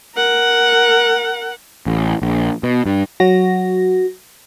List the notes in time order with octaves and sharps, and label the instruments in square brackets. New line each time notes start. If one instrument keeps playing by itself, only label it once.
[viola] A#4 F#5
[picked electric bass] A1
A#1
B2
G2
[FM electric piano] F#3 F#4 A#6